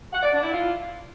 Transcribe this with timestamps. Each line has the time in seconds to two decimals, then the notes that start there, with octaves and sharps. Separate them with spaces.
0.13 F#5
0.23 D5
0.33 D4
0.43 E4
0.53 F4